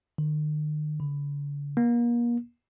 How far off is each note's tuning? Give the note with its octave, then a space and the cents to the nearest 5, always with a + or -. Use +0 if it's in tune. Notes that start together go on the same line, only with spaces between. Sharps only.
D#3 -45
D3 -40
A#3 +35